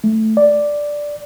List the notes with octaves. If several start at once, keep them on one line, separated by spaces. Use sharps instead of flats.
A3
D5